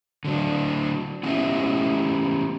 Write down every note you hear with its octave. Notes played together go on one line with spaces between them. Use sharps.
D3 F#3 D4
B3 C#4 E4 G4 D#5 E5